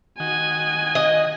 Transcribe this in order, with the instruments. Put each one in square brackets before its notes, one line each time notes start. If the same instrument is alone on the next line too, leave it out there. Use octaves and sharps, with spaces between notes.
[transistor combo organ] D#3 F#4 [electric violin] G#5
[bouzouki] D#5